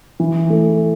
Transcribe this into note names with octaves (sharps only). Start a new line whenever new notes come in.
E3
A3